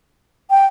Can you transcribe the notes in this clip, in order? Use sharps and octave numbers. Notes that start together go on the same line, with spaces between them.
G5